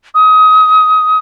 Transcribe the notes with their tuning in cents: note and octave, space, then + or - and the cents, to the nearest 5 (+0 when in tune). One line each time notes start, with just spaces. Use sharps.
D#6 +25